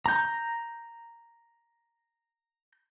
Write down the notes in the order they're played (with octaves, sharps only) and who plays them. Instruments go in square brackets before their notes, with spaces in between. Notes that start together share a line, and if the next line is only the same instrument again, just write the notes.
[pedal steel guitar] A#5 G6